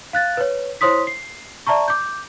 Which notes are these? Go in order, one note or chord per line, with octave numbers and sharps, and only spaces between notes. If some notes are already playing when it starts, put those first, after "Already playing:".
F5 F#6 A6
B4 C#5
E4 C5 C#5 C6 D#6 B6
C7
D5 E5 A5 A#5 C#6
D6 G6